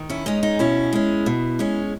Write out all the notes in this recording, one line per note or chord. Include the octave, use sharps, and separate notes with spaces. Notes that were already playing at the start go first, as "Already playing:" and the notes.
Already playing: D#3
C#4 E4
G#3 C#4 D#4
D#4
B2 C#4 E4
G#3 C#4
B2
G#3 C#4